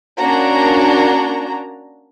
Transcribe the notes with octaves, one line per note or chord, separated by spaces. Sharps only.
A#3 C#4 D4 F#4 A#5